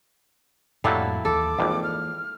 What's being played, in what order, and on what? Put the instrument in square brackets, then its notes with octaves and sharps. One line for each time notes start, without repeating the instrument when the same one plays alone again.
[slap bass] F2 A2 A#3 [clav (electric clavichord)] F#3 G3 [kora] E4 A4 F5
[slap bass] D#2 E3 [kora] A4 [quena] D6
[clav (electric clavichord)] G#1 F2 [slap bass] E3 A#3
[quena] F6